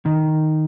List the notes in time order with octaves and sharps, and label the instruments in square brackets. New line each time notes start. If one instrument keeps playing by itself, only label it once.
[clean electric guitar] D#3